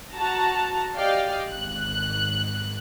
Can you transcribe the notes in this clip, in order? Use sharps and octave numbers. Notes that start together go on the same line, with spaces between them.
F#4 A5 A#5
G4 D5 D#5 F5 G5
G#1 F#6